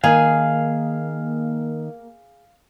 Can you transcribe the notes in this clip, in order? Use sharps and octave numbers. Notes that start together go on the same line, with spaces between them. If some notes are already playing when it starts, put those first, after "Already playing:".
D#3 A#3 G#4 F5 G#5